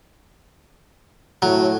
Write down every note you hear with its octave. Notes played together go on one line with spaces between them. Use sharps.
A2 F#3